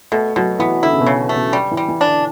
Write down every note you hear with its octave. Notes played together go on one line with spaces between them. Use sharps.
B2 A3
B2 F#3
E3 B3
D3 E4
C#3
B2
C#3
A3
B2
G3
E3
G3
E3
D3 D4